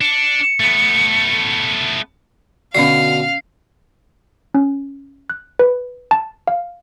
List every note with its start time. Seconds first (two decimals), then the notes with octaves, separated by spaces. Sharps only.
0.01 D4 C#7
0.60 A3 B3
2.75 B2 D3 C#4 F#4 D5 F5 C7
4.54 C#4
5.30 F#6
5.59 B4
6.11 A5
6.48 F5